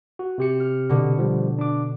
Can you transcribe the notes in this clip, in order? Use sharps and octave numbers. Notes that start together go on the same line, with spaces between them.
F#4
C3 G4 C#7
F6
B2 D3
F3 G3
D4 D6